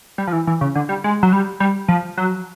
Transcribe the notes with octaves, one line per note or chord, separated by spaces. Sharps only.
G3
F3
E3
E3
C#3
D3
G3
G#3
F#3
G3
G3
F3
F#3